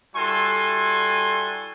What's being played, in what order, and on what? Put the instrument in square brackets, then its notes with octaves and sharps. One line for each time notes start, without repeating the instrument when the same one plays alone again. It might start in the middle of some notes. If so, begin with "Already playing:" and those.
[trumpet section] G3 E4 F#4 A4 G#5 C6